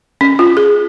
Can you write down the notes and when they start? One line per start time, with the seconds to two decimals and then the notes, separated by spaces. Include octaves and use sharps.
0.21 C#4
0.39 F4
0.57 G#4